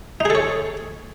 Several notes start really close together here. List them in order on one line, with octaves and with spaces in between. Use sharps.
D#4 G#4 A4 C#5